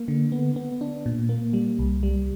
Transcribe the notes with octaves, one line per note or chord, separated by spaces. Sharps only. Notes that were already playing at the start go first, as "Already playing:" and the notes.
Already playing: A#3
D3
B3
B3
D4
A#2
A#3
G3
C2
G3